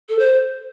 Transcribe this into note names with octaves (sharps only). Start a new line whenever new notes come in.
A4
C5